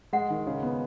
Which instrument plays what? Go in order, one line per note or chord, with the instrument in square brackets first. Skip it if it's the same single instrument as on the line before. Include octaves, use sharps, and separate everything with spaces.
[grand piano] G#3 [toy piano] F#5
[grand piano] D#3
C#3
B3